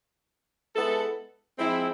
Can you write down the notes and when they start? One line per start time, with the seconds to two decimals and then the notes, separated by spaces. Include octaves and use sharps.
0.75 G#3 B3 E4 A4
1.59 F3 G#3 C4 E4